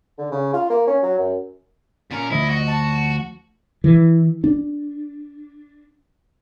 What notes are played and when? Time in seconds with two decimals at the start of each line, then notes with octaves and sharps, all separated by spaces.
0.18 D3
0.31 C#3
0.53 F4
0.70 A#3
0.87 C#4
1.03 F#3
1.19 F#2
2.11 A#2 C#4 A#4
2.31 D2 F3 E4 D#5
2.50 F#4
2.67 A5
3.84 E3
4.44 D4